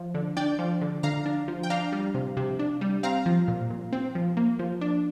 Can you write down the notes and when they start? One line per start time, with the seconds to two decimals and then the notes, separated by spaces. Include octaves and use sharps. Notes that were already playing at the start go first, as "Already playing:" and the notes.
Already playing: F3
0.14 D3
0.37 D4 D5 G5
0.59 F3
0.81 D3
1.03 D3 F5 A#5
1.26 D4
1.48 F3
1.63 G5
1.70 D4 F5 A#5
1.92 G3
2.14 C3
2.37 C3
2.59 D4
2.81 G3
3.03 C4 F5 A#5
3.26 F3
3.48 A#2
3.70 A#2
3.93 C4
4.15 F3
4.37 A#3
4.59 F3
4.81 D4